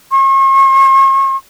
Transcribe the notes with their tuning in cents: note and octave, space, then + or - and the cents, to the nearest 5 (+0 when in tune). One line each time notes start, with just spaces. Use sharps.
C#6 -45